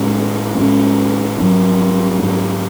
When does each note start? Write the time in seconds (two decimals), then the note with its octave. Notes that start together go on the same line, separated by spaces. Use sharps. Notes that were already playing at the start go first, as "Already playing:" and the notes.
Already playing: A2 G#3 C#4
0.58 A2 G#3 C#4
1.40 G#2 F#3 C#4
2.22 G#2 F#3 C#4